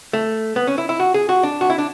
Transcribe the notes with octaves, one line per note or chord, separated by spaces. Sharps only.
A3
B3
C#4
E4
E4
F#4
G#4
F#4
D4
F#4
E4
D4